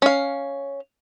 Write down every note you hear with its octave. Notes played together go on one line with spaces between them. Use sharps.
C#4 F5